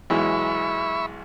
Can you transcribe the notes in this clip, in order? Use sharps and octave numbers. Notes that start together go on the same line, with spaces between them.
B1 E3 G#3 E5 B5 C#6